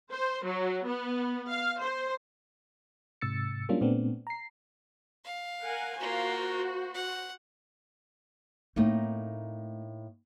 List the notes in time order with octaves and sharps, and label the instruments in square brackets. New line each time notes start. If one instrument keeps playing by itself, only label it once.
[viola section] C5
F#3
B3
F5
C5
[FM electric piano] G#2 C3 E6 A6 C#7
F#3 G3 A#3 C#4 D4 F4
A#2 A3 B3 C4 D4
A#5 C7
[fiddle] F5
[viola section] A#4 F#5 G#5
[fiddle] A#3 F4 [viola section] F#4 C5
[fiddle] F#5
[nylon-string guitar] A2 A#3 D#4 [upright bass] A3 C4